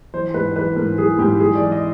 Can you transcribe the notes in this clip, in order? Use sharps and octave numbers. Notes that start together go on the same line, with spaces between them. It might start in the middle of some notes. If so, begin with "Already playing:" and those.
E3 C5
G#2 B4
E3 B4
G#2 A#4
E3 G#4
G#2 G4
E3 G#4
D5
E3
D#5